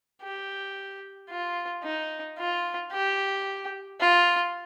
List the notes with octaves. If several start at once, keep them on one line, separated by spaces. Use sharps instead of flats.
G4
F4
D#4
F4
G4
F4